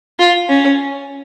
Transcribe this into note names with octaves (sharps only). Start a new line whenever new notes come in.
F4
C#4